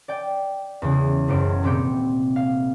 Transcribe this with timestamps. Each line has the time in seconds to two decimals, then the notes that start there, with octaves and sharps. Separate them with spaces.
0.08 D5 G5
0.82 E2 C#3
1.28 E1 C#2 F#2 C5 D7
1.63 D#1 C3 C4 G4 G6 C#7
2.36 F5